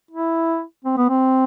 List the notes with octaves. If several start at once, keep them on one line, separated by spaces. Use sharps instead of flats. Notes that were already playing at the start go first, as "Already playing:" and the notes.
E4
C4
B3
C4